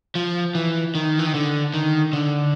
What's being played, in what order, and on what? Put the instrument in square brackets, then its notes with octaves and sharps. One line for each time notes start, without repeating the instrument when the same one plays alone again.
[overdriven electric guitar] F3
E3
D#3
E3
D#3
D3
D#3
D3